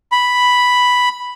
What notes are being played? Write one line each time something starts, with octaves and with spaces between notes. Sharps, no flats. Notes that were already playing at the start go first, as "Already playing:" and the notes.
B5